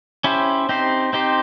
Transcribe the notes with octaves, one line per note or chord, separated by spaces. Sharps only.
C#4 E4 G4 C5
C4 D#4 G4 C5
C4 D#4 G4 C5